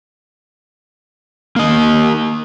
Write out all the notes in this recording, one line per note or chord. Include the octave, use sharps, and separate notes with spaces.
A#3 D#5